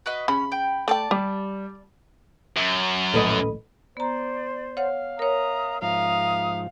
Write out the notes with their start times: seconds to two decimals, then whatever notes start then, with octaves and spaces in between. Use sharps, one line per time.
0.06 F#4 B4 D#5
0.28 C#3 C#4 B5
0.52 G5
0.88 A3 D5 G5 A5
1.11 G3 G4
2.57 F#2
3.14 A#1 D#2 A2 A4 B4 D#5
3.97 B3 C5 D5 A#5
4.77 C#5 F5 F#5
5.19 A#4 C#5 E5 A#5 D#6
5.82 G#2 F3 E5 F5 A#5 D#6